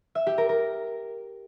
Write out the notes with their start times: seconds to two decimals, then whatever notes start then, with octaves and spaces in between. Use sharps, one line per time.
0.15 E5
0.27 G4
0.38 A#4
0.49 A#4